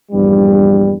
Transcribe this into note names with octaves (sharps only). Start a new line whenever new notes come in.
A#1 E2 G2 G3